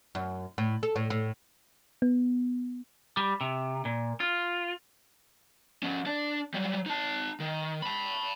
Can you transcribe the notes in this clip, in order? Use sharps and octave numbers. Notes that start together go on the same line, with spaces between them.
F#2
A2
A4
A2
A2
B3
G3
C3
A#2
F4
F3 C#4
D4 D5
F#3 G3
D#4 A5
D#3
A5 B5